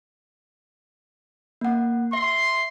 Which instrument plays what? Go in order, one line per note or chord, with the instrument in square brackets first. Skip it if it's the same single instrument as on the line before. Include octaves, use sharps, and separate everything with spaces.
[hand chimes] A#3 F#5
[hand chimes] E5 [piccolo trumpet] C6